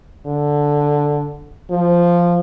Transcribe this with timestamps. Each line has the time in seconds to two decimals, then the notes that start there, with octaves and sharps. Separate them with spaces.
0.26 D3
1.70 F3